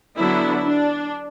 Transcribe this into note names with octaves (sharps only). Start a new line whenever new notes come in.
D3 F#3 B3 D4 E4
D4